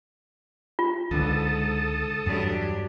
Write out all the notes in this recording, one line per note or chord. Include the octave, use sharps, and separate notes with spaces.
F4
C#2 G#2 D3 D4 A4 A5 D#6
E2 G2 F#3 D4 G4